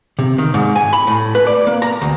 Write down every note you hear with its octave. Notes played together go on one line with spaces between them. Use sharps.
C3
D#3
G#2
G#5
B5
A2
B4
D5
A#3
A#5
D2